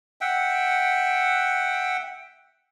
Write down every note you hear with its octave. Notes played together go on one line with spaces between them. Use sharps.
E5 F#5 G5